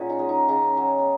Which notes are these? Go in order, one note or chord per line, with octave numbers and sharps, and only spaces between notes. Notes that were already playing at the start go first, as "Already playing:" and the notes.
Already playing: A#2 F#3 C#4 F#4 G#4
D#4
G#3
D#4
C#3 D#4
F#3
B3